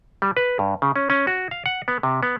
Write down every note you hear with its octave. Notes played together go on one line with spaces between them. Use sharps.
G3
B4
G2
C#3
C#4
C#4
F#4
F5
F#5
B3
C3
B3